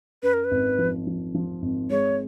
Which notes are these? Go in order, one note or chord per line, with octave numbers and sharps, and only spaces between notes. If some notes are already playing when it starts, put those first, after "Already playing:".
F#2 B4
A#4
B4
G#1
F3
F3
F3
G#1
G#3 C#5